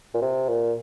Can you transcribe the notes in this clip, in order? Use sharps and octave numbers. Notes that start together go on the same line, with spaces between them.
A#2
C3
A#2